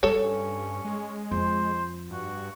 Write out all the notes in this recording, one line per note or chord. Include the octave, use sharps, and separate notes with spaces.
G2 G3 A4 C#5
C#4
G#3
F2 C5
G2 F#4